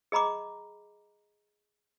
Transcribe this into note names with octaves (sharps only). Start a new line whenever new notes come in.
G#4 D#5 A#5 B5 D6